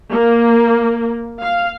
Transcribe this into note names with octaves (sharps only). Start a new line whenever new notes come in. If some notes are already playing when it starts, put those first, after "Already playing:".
A#3
F5